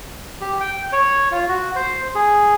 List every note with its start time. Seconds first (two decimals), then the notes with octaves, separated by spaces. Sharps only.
0.41 G4
0.60 G5
0.92 C#5
1.31 F4
1.48 F#4
1.76 C5
2.15 G#4